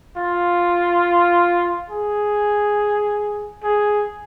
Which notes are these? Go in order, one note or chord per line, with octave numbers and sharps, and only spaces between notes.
F4
G#4
G#4